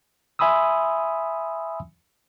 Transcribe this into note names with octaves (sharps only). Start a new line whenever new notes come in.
E5 G#5 B5 C6 D#6 E6